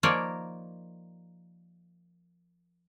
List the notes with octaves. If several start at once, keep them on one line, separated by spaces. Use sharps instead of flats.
F3 A#3 D#4 A#4 C#5 D5